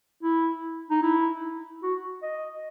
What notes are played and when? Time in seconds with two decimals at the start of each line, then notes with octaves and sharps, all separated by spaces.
0.23 E4
0.91 D#4
1.03 E4
1.83 F#4
2.22 D#5